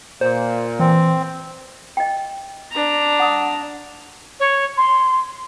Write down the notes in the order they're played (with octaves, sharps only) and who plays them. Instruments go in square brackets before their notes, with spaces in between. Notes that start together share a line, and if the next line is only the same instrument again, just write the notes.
[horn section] A#2 [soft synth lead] C5
[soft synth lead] E3 [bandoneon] C4
[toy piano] D#5 G5
[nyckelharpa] D4 A#5
[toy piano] F#5 D#6
[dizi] C#5
C6